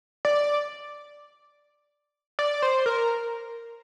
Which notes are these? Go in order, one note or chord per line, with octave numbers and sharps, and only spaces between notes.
D5
D5
C5
A#4